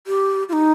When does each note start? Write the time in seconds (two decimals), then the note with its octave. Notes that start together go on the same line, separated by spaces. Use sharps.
0.07 G4
0.49 F4
0.53 D#4